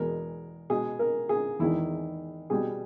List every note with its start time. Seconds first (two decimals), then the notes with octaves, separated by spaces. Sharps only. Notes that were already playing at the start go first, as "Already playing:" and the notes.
Already playing: E2 B2 G#3 A#4
0.70 B2 G#3 G#4
0.99 A#4
1.29 G#4
1.59 E2 D#3 G#3 E4
2.50 B2 G3 G#4